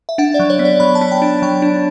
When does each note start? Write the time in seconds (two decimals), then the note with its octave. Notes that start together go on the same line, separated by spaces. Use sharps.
0.09 E5
0.18 D4 F#5
0.34 D5
0.39 F#3
0.50 C#5
0.59 B3
0.65 D5
0.80 F#3 B5
0.95 A5
1.01 B3
1.12 G5
1.22 D4
1.42 F#3 G5
1.62 D4